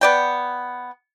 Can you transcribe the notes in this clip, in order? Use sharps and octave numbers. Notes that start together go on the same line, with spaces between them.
B3 D5 G5